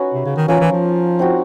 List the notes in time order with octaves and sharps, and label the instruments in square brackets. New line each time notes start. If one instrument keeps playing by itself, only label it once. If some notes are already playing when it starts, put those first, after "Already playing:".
Already playing: [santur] C#4 D#4 F#4 B4
[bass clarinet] C3
C#3
D#3
[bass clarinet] E3 [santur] C#4 F4 A#4
[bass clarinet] E3
F3
[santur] C4 D#4 F#4